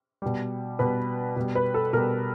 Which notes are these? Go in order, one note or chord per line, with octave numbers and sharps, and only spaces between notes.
B2 G3
B2 G3 B4
B2 G3
B4
A4
B2 G3 A#4